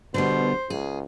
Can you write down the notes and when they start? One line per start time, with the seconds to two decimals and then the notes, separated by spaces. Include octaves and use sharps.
0.14 B2 D3 G3 B3 C5
0.70 C#2 G#4